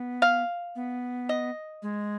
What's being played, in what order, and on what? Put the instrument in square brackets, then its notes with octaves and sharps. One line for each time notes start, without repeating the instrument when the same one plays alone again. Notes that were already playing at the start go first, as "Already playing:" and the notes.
Already playing: [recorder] B3
[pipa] F5
[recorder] B3
[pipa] D#5
[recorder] G#3